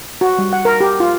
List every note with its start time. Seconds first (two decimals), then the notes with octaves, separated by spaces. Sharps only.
0.21 F#4
0.38 G3
0.53 F#5
0.65 A#4
0.80 G4
1.00 F4